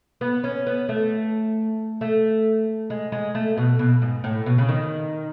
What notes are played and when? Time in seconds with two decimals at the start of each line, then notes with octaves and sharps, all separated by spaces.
0.21 B3
0.44 C#4
0.67 B3
0.89 A3
2.01 A3
2.90 G#3
3.12 G#3
3.35 A3
3.58 B2
3.79 B2
4.02 G#2
4.24 A2
4.46 B2
4.58 C#3
4.69 D#3